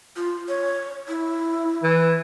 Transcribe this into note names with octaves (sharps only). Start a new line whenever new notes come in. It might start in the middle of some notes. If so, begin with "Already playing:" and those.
F4
C#5
E4
E3